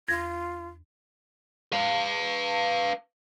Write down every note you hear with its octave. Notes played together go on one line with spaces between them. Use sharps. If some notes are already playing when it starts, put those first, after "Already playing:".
E2 F4 G#6 A#6
B4 F5